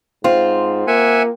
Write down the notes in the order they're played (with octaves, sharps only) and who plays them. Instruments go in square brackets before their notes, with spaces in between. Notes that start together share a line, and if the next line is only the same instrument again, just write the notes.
[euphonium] G#2 [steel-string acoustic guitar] C4 [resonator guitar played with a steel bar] F4
[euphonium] A#3 [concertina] E5 F#5 G#5